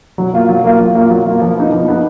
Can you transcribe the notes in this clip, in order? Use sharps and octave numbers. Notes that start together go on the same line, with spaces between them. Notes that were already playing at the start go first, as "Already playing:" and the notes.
F#3
A#3 F4
F#3
A#3 F4
F#3
A#3 F4
F#3
A#3 F4
F3
B3 D#4
F3
B3 D#4